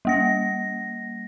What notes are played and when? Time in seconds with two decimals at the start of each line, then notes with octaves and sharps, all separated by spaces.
0.05 G3 A#3 A#6